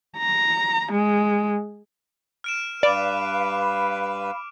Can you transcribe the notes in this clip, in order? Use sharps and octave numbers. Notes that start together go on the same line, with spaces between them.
A#5
G#3
F6 D7 E7
G2 B4 D5 F5 B5 D6 D7